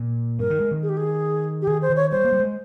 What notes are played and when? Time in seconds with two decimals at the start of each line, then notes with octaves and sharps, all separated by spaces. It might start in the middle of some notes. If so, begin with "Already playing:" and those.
Already playing: A#2
0.39 G2 A#4
0.50 D#3
0.60 G#3
0.71 D#3
0.83 G#4
0.89 G4
0.97 G#4
1.62 G4
1.67 D#3 G#4
1.82 C5
1.90 D#3
1.96 C#5
2.11 G3 C5
2.25 A#3
2.33 G3
2.40 G#3